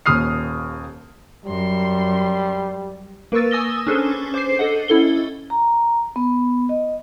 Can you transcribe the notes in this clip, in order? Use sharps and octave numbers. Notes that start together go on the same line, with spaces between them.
D#1 D#2 D#6 F6 C7
F#2 G3 C6
A#3 A#4 B4 C#6 E6 A6
G#5 D#6 E6 A#6 G7
C#4 D4 G#4 A4 B4 C5
C5 D6 G6 C7
A4 D#5 F#5
C#4 E4 A4 G7
A#5
B3
D#5